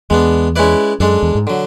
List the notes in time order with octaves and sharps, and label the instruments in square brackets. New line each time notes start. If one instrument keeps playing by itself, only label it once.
[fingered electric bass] E2 [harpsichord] G#3 B3 D4
[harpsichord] G#3 C#4 E4 B4 D5
[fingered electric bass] F#2 [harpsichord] G#3 D4 A4
[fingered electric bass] E2
G#2
[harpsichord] D3 F#3